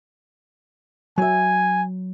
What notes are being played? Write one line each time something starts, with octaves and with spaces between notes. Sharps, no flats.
F#3 E5 G#5